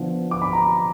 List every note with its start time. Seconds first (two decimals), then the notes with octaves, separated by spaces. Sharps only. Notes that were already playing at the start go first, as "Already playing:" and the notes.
Already playing: D3 F3 B3
0.31 D6
0.42 B5
0.53 A#5